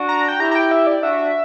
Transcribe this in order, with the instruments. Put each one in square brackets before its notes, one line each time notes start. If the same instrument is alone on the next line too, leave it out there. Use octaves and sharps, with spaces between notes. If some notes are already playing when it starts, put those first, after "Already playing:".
Already playing: [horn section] D4 F#4
[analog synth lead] A#5
G5
[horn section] E4 G4 [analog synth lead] A#5
[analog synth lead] A#5
G5
E5
D5
[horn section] D4 F#4 [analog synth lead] E5